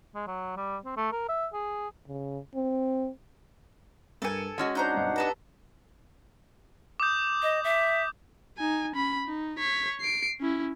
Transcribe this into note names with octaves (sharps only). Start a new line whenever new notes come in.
G#3
F#3
G3
C4
A3
A#4
E5
G#4
C#3
C4
G2 A4 A#4 G#5 C#7
G#3 C#4 F#4 D#5
D4 D#4 C5 F#5 A#5 G6
B1 G2
B3 G4 A4 B4 A#5
D6 D#6 G6
D#5
E5
D#4 G#5
C#4 B5
D#4
C#5 B6
C7 D7
C#4 E4